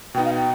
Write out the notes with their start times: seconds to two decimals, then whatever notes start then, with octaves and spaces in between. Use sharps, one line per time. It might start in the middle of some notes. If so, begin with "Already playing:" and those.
0.14 B2 B3 D#4 G5
0.25 F5
0.35 G5